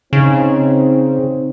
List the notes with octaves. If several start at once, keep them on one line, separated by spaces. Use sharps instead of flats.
C#3 C4 D#4